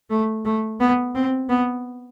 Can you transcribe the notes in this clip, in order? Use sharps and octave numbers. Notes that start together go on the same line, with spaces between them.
A3
A3
B3
C4
B3